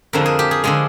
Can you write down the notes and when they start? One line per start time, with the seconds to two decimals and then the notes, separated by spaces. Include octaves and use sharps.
0.13 F2 D3 F3 G#3 A#4
0.26 G#4
0.39 G4
0.51 G#4
0.64 D3 F3 G#3 G#4